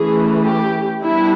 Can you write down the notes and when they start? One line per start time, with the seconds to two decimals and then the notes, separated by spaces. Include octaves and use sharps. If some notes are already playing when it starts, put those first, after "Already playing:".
Already playing: E3 A3 C#4 G#4
0.45 G4
1.03 G3 B3 D4 E4